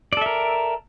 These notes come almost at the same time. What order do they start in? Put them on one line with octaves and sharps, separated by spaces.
D5 A4 E5 A#4